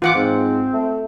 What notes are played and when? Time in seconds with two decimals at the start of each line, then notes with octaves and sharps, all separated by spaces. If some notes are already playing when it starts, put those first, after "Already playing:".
0.02 E3 F4 F#5 D6
0.15 G#2 C4
0.73 A3